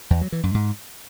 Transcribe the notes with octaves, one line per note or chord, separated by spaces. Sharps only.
E2
F#3
E3
F#2
G#2